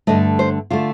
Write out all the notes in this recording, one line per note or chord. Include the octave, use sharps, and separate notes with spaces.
G2 D3 A3 D#5
C5
D3 A3 F4